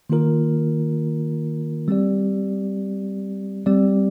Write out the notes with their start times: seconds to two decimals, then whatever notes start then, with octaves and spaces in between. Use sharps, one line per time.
0.10 D#3 A#3 F4 A#4
1.88 G3 C4 G4 D5
3.66 G3 C4 G4 D5